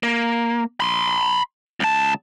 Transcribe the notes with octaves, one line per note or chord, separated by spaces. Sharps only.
A#3
B5 C6
C#2 A5